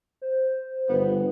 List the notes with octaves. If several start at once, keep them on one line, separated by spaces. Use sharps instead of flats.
C5
G1 B3